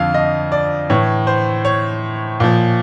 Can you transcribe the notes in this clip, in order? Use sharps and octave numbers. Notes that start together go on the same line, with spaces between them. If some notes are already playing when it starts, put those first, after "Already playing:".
Already playing: F2 D3 F3 F5
D#5
D5
A2 E3 C#5
C5
C#5
A#2 F3